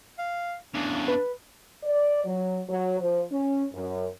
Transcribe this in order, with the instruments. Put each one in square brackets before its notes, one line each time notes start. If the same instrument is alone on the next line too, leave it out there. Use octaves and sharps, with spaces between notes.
[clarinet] F5
[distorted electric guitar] E2 C#3 [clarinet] D4
[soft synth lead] B4
[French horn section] D5
F#3
F#3
F3
C#4
F#2